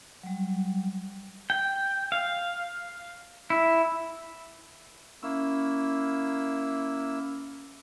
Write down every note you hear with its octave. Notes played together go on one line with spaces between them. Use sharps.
F#3 G3
G5
F5
E4
A#3 C#4 E4 E6